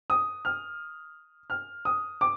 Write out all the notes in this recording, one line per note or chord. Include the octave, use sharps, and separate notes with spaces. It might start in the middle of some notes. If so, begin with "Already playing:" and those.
D#6
F6
F6
D#6
D6